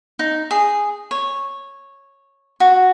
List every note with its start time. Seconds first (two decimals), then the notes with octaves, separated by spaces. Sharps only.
0.19 D#4
0.51 G#4
1.11 C#5
2.60 F#4